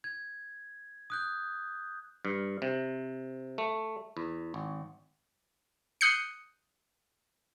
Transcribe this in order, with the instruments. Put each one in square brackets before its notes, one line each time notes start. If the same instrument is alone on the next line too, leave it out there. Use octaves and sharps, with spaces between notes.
[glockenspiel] G#6
D#6 F#6 G6
[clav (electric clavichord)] G2
C3
A3
E2
G#1
[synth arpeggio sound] D#6 F#6 G6 C7 C#7